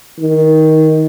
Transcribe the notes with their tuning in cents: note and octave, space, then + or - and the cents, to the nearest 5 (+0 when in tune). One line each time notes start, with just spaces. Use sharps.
D#3 +15